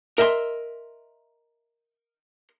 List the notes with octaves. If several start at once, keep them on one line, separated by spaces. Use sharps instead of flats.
A#4 D#5 E5 G#5 C6